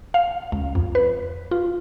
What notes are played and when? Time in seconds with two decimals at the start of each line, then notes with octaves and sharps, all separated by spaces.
0.14 F5
0.52 C#2
0.75 F2
0.95 B4
1.51 F4